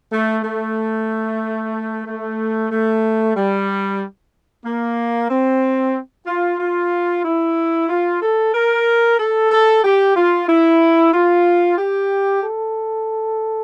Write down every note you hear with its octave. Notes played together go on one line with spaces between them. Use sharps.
A3
A3
A3
A3
G3
A#3
C4
F4
F4
E4
F4
A4
A#4
A4
A4
G4
F4
E4
F4
G4
A4